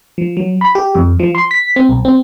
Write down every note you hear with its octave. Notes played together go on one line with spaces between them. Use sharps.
F3
F#3
B5
G4
F2
F3
C6
B6
C4
B1
C4